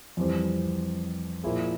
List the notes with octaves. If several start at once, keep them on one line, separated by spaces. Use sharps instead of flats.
F2 E3 G3 C4
A#2 F3 A#3 E4 G#4